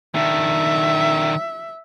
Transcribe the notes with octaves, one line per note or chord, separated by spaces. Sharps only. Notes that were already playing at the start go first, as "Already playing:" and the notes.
D#3 D4 E5